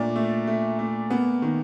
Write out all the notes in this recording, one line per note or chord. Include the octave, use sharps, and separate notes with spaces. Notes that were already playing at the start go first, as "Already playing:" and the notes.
Already playing: A#2 A3 D4
A3
A3
A3
A#3 B3
D#3